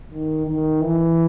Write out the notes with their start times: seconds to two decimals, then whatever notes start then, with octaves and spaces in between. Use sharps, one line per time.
0.11 D#3
0.47 D#3
0.81 E3